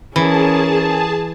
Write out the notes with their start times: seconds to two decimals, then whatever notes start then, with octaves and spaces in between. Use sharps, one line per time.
0.16 E3 C#4 G#4 A#4 A5